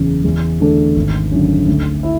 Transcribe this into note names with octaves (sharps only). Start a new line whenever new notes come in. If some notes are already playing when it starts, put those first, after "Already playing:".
Already playing: F#1 E2 C#3
E2
D3 A3 D4 A4
G#1
F#2 D3
D2
E4